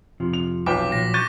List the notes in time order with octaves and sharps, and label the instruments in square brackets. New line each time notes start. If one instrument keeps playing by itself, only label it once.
[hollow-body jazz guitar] F2 C3 F3
[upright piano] F7
[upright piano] B1 B4 G5 [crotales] D6 B6
[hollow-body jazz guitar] A#2 F3 F#3 [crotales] A#6
[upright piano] C#6 G6 A6 [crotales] D#7